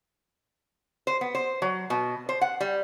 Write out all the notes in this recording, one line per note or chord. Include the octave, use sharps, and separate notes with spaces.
C5
B3
C5
F#3
B2
C5
F#5
G3